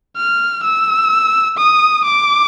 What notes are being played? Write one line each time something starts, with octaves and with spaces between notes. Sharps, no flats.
F6
E6
D#6
D6